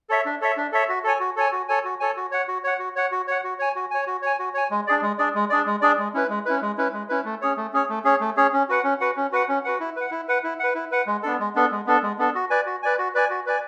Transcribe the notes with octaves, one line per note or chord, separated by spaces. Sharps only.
A4 C#5 E5
D4
A4 C#5 E5
D4
A4 C#5 E5
F#4
A4 C#5 G#5
F#4
A4 C#5 G#5
F#4
A4 C#5 G#5
F#4
A4 C#5 G#5
F#4
C#5 F#5
F#4
C#5 F#5
F#4
C#5 F#5
F#4
C#5 F#5
F#4
C#5 G#5
F#4
C#5 G#5
F#4
C#5 G#5
F#4
C#5 G#5
G#3
D4 G#4 D5
G#3
D4 G#4 D5
G#3
D4 G#4 D5
G#3
D4 G#4 D5
G#3
C#4 E4 B4
G#3
C#4 E4 B4
G#3
C#4 E4 B4
G#3
C#4 E4 B4
A3
C#4 G#4 C#5
A3
C#4 G#4 C#5
A3
C#4 G#4 C#5
A3
C#4 G#4 C#5
C#4
F#4 B4 F#5
C#4
F#4 B4 F#5
C#4
F#4 B4 F#5
C#4
F#4 B4 F#5
E4
B4 F#5
E4
B4 F#5
E4
B4 F#5
E4
B4 F#5
G#3
B3 D4 A4
G#3
B3 D4 A4
G#3
B3 D4 A4
G#3
B3 D4 A4
F#4
B4 D5 G#5
F#4
B4 D5 G#5
F#4
B4 D5 G#5
F#4
B4 D5 G#5